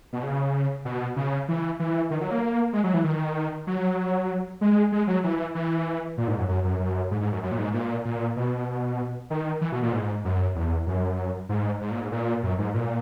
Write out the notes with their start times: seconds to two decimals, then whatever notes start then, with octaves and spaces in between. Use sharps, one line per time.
0.13 B2
0.23 C#3
0.85 B2
1.16 C#3
1.48 E3
1.80 E3
2.11 D#3
2.21 F#3
2.31 A#3
2.73 G#3
2.84 F#3
2.94 E3
3.04 D#3
3.67 F#3
4.61 G#3
4.92 G#3
5.07 F#3
5.24 E3
5.55 E3
6.17 A#2
6.28 G#2
6.38 F#2
6.49 F#2
6.64 F#2
6.79 F#2
7.11 G#2
7.21 G#2
7.32 F#2
7.43 F#2
7.52 A#2
7.58 G#2
7.74 A#2
8.05 A#2
8.36 B2
9.30 D#3
9.61 E3
9.72 B2
9.82 A#2
9.92 G#2
10.25 F#2
10.55 E2
10.87 F#2
11.49 G#2
11.81 G#2
11.91 A#2
12.01 G#2
12.12 A#2
12.43 F#2
12.58 G#2
12.74 A#2